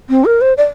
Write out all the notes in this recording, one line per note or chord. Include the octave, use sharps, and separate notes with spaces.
C4
A#4
C5
D5